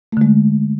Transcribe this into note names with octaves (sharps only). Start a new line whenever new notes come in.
D3 G#3 A3